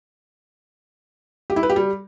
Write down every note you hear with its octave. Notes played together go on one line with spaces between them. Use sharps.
G4
E4
B4
G4
G3